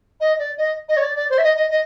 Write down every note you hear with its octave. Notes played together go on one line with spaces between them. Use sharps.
D#5
D5
D#5
D#5
C#5
D5
D5
C5
E5
D#5
D#5
D#5